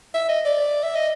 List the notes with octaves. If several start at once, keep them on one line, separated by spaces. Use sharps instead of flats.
E5
D#5
D5
E5
D#5